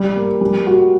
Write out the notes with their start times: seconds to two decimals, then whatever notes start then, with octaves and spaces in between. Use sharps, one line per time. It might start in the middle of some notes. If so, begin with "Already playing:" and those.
Already playing: G3
0.16 A#3
0.41 G3
0.67 F#4